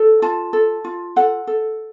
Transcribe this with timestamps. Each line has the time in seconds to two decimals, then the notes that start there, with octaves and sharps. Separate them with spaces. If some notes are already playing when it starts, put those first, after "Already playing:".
Already playing: A4
0.22 F4 A5
0.53 A4
0.85 F4
1.16 A4 F#5
1.47 A4